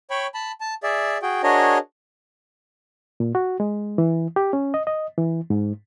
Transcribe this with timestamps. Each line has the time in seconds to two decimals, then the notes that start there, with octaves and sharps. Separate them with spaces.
0.10 C#5 G5 B5 C#6
0.34 A5 B5
0.60 A5
0.83 G#4 D5 E5
1.22 F#4 G#4 G5
1.43 D4 F#4 G#4 A#4 C#5 D#5
3.20 A#2
3.35 F#4
3.60 G#3
3.98 E3
4.36 G4
4.53 C#4
4.74 D#5
4.87 D#5
5.18 E3
5.50 G#2